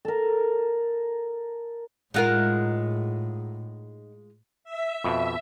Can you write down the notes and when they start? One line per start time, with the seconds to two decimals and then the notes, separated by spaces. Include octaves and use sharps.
0.05 A4 A#4
2.14 A2 G#3 D#4 F4 A#4 F#5
4.64 E5
5.04 F2 B2